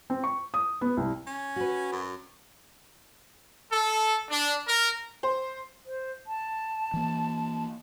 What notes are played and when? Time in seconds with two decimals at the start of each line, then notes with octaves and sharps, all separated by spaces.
0.10 C4
0.24 C#6
0.54 D#6
0.81 B3
0.97 C2
1.27 C#4
1.56 F#4 B4
1.92 F#2
3.71 A4
4.31 D4
4.68 A#4
5.23 C5
5.86 C5
6.27 A5
6.94 E3 A#3